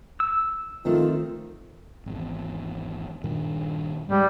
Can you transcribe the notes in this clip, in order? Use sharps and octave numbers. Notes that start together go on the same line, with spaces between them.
E6
D#3 A3 C4 F4
G#1 E2
G2 A#2 D#3
G#2 G3 G#3